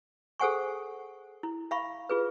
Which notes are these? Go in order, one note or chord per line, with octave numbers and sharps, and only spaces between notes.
G#4 A4 C5 F#5 G#5 C#6
E4
E5 F5 B5 C#6
F4 G#4 B4